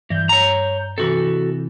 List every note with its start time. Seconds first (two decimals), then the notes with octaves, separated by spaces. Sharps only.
0.10 G2 E3 G6
0.29 C#5 A#5
0.98 C3 E3 F#4 A4